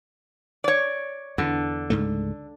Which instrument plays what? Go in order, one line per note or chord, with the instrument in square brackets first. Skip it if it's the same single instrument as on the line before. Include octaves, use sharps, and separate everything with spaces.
[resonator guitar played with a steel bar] C#5 D5
[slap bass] E2 [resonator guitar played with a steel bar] D3
[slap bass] C#2 G#2 A3